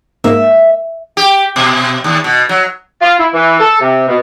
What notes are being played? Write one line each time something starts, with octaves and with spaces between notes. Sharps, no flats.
G#2 A#3 E5
G4
B2
D#2
B2
F#3
F4
E4
E3
A4
C3
B2